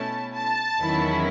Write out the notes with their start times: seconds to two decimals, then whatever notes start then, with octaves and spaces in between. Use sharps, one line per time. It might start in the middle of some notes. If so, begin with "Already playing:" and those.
Already playing: B2 A3 C#4 E4 A5
0.34 A5
0.79 E2 D#3 F#3 C#4 E4